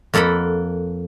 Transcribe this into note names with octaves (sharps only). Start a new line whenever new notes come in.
F2 A#3 A4 F#5 B5